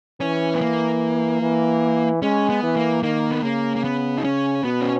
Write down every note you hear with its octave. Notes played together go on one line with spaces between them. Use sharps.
E3 C#4
B3
A#3
E3
G#3 C#4
B3
E3
A#3
D#3 A#3
B3
C#3 A#3
A#3
B3
D#4
C#4
B2 B3
C#4